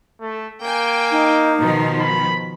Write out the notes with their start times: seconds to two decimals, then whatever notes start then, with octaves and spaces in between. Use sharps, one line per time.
0.21 A3
0.62 A#3 G5 G#5
1.11 D#4
1.58 B2 D#3 F3
2.00 B5